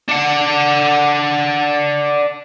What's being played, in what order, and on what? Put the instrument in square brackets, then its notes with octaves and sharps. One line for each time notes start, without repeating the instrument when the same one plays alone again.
[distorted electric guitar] D4 F#5